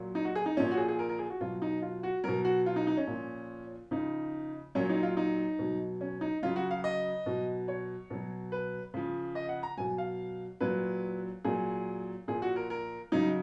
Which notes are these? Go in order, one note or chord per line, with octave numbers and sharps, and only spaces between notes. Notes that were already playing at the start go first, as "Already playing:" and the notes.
Already playing: A#2 F#3
D#4
F#4
G#4
D#4
A#2 F3 C#4
F#4
G#4
G#4
A#4
A#4
G#4
F#4
B2 F#3 F4
D#4
F4
F#4
B2 F#3 A#4
F#4
F4
D#4
D#4
C#4
A#2 F3
C#3 F3 D#4
A#2 F#3 C#4
D#4
F4
D#4
B2 F#3
C#4
D#4
C#3 F#3 F4
F#4
F5
D#5
B2 F#3
C#5
B2 F#3
B4
C#3 F3
D#5
F#5
A#5
B2 F#3 G#5
F5
A#2 F#3 B4
A#2 F#3 G#4
A#2 F3 G#4
F#4
A#4
A#4
C#3 F#3 D#4